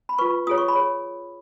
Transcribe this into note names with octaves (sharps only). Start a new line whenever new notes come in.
B5
F4 B4 C#6
F4 G#4 C#5 D#6
C#6
B5
G#4 C#5